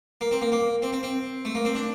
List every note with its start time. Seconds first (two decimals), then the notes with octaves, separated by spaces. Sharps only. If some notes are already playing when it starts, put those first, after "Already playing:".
0.21 A#3
0.31 C4
0.41 A#3
0.52 A#3
0.82 C4
0.93 C4
1.03 C4
1.45 A3
1.55 A#3
1.65 C4
1.75 D4